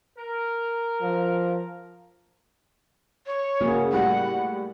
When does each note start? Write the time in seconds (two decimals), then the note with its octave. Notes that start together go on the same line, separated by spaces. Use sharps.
0.17 A#4
1.01 F3
3.27 C#5
3.61 C#3 A#3 F#4 G#4
3.92 A2 G3 G#3 F#5